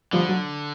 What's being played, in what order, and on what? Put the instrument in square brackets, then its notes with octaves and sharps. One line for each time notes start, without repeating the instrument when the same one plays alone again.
[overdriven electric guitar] D3 [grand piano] F3 G3
[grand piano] F#3